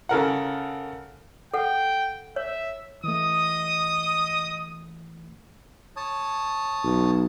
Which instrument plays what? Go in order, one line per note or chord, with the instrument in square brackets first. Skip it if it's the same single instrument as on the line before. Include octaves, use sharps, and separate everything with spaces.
[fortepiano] C#3 A4 A#4 F#5
[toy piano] A4 F#5 [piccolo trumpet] G5
[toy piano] C#5 [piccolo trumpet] E5
[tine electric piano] E3 A3 [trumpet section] D#5 D#6
[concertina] C#5 A5 D#6
[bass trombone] B1